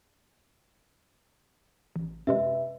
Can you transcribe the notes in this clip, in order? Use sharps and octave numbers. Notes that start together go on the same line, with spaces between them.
A1
F#2 C3 G#3 B4 E5